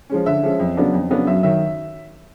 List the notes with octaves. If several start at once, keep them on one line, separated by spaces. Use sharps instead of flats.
F3 G#3 C#4
D3 E5
F3 G#3 C#4
F2
C#3 F#3 B3 D4
F2
C#3 F#3 B3 D4
F#2 E5
D#3 F#3 E5